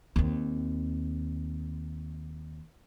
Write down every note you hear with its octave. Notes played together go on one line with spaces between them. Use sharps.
D#2 C4